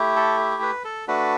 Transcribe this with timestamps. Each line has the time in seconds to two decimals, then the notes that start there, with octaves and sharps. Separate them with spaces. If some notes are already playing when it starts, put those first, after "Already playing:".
Already playing: A3 E4 G4
0.16 A4
0.62 B4
0.84 A4
1.08 A3 D4 F#4 B4